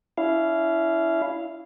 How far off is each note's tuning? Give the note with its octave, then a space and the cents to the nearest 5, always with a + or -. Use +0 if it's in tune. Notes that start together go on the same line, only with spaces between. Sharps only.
C#4 +45 E4 +0 F5 -10